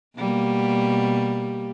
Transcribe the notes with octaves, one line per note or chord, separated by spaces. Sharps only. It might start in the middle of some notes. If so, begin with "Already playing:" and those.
B2 G3 A#3